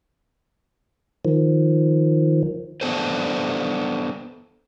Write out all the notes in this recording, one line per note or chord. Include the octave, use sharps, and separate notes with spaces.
D#3 F3
B3 D4 A4 B4 C5